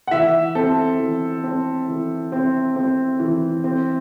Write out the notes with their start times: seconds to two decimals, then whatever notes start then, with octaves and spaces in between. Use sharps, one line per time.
0.08 F#5
0.11 E3 E5
0.55 C4 A4
1.00 E3
1.44 C4
1.88 E3
2.32 C4
2.76 C4
3.20 E3
3.64 C4